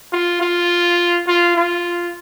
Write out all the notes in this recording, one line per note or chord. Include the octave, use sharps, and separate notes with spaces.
F4
F4
F4
F4